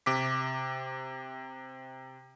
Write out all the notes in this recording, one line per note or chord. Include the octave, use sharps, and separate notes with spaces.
C3 D6 B6